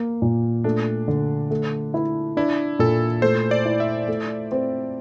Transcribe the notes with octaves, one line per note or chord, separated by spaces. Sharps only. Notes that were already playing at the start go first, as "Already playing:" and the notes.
Already playing: A#3
A#2
A3 D4
D3
A3
E4
D4 E4
A#2 A4
A3 C5
D5
E4
E5
A3
C4